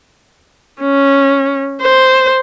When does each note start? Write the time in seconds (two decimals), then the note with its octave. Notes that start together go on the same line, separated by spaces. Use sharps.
0.81 C#4
1.82 C5